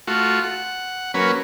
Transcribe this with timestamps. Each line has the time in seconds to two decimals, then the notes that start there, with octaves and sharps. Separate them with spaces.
0.07 A3 F4 F#4
0.44 F#5
1.14 F#3 A#3 C#4 B4